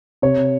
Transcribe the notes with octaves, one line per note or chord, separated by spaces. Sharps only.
C3 C#5